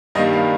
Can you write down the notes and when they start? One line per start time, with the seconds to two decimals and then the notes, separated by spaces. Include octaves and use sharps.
0.15 G2 D#3 G3 A#3 D#5
0.33 F5